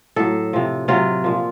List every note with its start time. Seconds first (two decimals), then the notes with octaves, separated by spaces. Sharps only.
0.16 A2 F#3 A4
0.53 C3 F3
0.88 C3 F#3 F4
1.24 A#2 F3